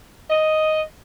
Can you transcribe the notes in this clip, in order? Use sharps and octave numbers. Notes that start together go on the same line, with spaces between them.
D#5